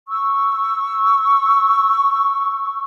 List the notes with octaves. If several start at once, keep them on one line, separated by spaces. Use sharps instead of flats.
C#6 E6